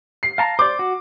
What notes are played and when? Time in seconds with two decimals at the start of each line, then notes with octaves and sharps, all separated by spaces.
0.23 C7
0.38 F5 A5 A#5
0.59 C5 D5 D6
0.79 F#4